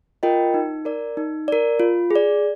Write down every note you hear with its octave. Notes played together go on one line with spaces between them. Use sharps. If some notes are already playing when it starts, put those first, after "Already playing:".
F4 A#4 D#5 G5
D#4
A#4 D5
D#4
A#4 D5
F4
G#4 D5